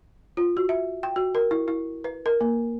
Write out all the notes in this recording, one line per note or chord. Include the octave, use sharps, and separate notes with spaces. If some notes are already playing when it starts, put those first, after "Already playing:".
F4
F#4
E5
G5
F#4
A#4
E4
E4
B4
A#4
A#3